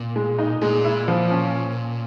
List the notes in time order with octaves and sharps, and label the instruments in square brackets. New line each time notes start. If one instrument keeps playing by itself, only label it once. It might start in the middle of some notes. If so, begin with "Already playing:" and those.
Already playing: [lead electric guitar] A#2
[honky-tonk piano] G#3
D#4
[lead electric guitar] A#2 [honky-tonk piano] G#3
[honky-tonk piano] E4
F3
C#4